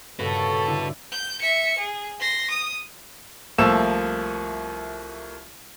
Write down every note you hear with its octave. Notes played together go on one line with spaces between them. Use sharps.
G2 A#2 C#3 F#4 A4 B4 C#6
D3 E4 D5
G6
E5 C#7
G#4
C6 A#6
D#6
C2 F3 A3 A#3 E6 E7